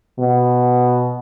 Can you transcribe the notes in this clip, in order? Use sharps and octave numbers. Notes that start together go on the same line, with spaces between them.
B2